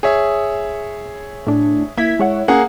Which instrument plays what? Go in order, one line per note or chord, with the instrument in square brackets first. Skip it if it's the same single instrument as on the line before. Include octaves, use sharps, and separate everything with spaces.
[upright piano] G#4 C#5 E5
[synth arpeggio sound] A2 D4
[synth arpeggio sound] A#3 G#6 B6 [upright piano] E4
[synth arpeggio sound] G#3 C#5 F#5
[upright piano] A#3 G#4 F#5 [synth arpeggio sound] C#4